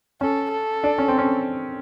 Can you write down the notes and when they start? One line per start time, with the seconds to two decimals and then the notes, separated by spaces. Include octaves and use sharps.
0.21 C#4 A4
0.52 A4
0.84 D4
0.98 C#4
1.08 C4
1.18 C#4